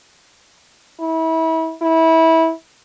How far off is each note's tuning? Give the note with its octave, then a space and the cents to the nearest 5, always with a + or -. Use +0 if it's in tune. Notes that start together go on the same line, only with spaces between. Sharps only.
E4 -30
E4 -20